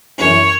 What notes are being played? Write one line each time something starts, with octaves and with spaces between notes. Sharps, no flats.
F#2 E3 C#4 E4 C#5